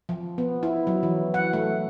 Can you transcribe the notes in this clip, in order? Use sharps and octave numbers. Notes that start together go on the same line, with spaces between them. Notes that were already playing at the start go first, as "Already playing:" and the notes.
F3
B3
E4
F#3
E3
F#5
A3